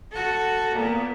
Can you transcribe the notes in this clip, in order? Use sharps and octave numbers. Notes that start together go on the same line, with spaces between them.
F#4 A4
A#2 B3